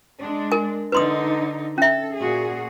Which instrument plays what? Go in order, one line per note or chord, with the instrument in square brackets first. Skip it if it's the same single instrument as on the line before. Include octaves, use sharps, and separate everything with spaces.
[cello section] G#3 D4
[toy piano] A#4 G#5
[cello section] D3 D#4 [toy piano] B4 C6 D#6
[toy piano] C#4 E5 [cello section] A4
[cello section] A#2 F#4 G#4